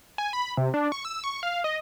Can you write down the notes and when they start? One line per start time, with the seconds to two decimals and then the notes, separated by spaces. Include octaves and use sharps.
0.18 G#5
0.33 B5
0.57 C3
0.74 D4
0.92 C#6
1.05 E6
1.24 C#6
1.43 F5
1.64 D#5